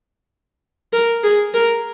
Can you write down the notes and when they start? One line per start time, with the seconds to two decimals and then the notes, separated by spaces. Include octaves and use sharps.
0.93 A#4
1.24 G#4
1.54 A#4